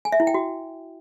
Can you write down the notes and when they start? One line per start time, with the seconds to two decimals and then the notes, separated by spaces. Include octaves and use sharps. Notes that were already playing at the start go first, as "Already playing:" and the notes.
0.05 G#5
0.12 E5
0.20 E4
0.27 G5
0.34 F#4